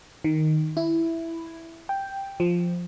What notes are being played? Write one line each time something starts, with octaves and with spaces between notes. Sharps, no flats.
D#3
E4
G5
F3